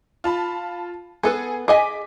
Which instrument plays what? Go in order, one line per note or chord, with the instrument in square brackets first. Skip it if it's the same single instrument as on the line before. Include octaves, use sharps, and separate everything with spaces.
[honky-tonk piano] F4 A5 B5
[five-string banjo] B3 A4 B4 [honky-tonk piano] G#4
[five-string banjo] G#4 D#5 G#5 [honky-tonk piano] D6 B6